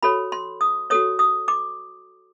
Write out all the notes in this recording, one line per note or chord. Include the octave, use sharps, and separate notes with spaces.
F#4 A4 C#5 B5
C6
D#6
F#4 A4 C#5 D#6
D#6
D6